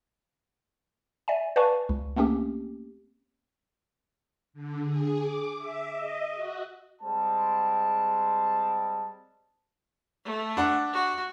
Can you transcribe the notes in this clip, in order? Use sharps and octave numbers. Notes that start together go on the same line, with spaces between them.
D5 E5 G#5
B4 D5 F5 G#5 A5 C#6
C#2
A3 A#3 C4 C#4 G4
D3
G#4
D6
E5
D#5
F#4
G3 G#3 C4 A5
A3
D4 F#5
F#4